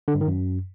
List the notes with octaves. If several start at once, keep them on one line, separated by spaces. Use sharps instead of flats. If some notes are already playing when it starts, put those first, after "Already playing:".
D3
G2
D#3
F#2